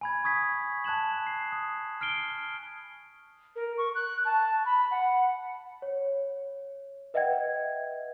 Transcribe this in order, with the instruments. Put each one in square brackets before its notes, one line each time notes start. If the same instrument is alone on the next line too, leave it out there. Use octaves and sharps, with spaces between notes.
[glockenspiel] G#5 B5 G#6
B5 C#6 D#6 G#6 B6
A5 F#6 G#6 E7 F#7
C7
D#6
F6 C7 D7 G7
[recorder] A#4
C#6
F#6
A5
B5
F#5
[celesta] C#5
B4 D#5 E5 F#5 G5 G#6